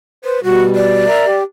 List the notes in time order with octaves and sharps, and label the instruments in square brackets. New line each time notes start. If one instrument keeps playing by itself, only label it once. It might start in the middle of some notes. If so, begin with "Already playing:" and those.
[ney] B4 [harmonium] C5
[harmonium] B2 G3 [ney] F#4
[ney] D5
[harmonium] A#4 E5 A#5
G4